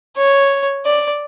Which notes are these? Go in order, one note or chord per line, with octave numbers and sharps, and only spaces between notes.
C#5
D5